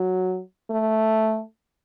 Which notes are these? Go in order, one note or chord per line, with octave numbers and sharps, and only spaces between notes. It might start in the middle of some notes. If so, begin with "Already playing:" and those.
Already playing: F#3
A3